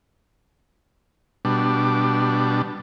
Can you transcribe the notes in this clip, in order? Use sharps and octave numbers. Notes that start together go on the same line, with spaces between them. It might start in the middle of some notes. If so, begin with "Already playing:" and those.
B2 G3 D4